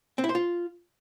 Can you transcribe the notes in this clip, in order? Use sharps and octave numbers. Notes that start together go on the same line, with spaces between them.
C4
E4
C5
F4